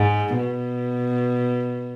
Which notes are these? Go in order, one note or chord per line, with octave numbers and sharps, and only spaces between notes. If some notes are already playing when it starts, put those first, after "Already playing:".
Already playing: G#2
B2